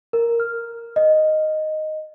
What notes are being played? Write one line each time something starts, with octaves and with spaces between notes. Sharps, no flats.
A#4
F6
D#5